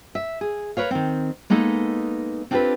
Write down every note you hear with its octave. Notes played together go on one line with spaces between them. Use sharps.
E5
G#4
A#4 B4 C#5 F5
D#3 C4
G#3 A#3 B3 D#4 A4
C4 D4 F4 G4 A4 B4